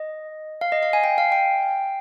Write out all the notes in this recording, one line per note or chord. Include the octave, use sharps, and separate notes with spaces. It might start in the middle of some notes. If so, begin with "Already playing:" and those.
Already playing: D#5
F5
D#5
F5
G#5
G5
F5
G5